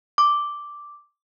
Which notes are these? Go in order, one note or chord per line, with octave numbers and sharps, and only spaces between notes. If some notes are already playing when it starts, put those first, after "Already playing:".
D6